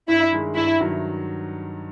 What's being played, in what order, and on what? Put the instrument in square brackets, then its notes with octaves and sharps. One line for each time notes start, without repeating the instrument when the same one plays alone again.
[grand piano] G2 [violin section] E4
[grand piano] D#3 G#3
[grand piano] G2 [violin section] E4
[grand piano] D#3 F#3